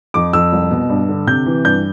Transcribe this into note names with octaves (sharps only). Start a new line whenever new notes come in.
F2 D6
F2 E6
C2
B2
G2
D3
C3 G6
E3
G2 G6